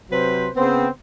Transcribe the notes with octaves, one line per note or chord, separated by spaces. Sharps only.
C3 F#3 B4 C5
C#3 B3 C4